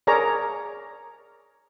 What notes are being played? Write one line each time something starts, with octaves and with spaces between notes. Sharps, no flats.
G#4 A#4 C#5 D5 A#5